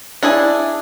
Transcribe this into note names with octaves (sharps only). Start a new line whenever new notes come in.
D4 E4 G#4 G#5